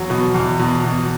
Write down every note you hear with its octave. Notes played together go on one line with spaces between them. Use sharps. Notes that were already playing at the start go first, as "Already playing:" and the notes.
Already playing: E2 F#3
B2
E2
B2
B2